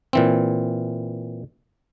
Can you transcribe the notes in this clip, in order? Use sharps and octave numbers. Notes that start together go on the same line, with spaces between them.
A#2 E3 C4